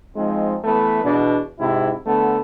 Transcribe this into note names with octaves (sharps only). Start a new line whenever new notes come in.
F3 G#3 C4 D#4
E3 A3 B3 B4
E2 B2 D4
G#2 C3 E4
D3 A3 B3